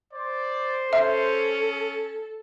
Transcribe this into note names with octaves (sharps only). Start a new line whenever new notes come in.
C5 D5
C#4 A4 E5